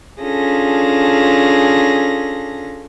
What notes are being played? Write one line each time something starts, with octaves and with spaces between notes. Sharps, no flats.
C#4 D4 F4 G#4 A4 A#6